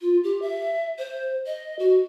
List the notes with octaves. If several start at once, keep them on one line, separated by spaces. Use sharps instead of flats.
F4
G4
E5
C5
D#5
F#4